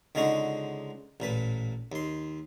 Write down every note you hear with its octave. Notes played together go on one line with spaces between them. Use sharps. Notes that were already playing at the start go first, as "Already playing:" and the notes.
C#2 D3 G#3 D#4 F#4 C#6
A1 A#2 B4
D#2 C6